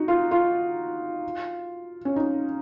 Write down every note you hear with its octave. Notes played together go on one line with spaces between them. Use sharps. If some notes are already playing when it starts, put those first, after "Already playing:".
Already playing: D#4 F#4
F4
F4
C#4
D#4